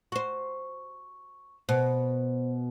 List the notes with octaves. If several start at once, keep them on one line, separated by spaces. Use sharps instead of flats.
F#4 C5 C#6
B2 C5